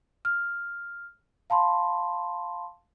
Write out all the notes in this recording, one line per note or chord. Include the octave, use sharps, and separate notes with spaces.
F6
F5 A5 B5 C6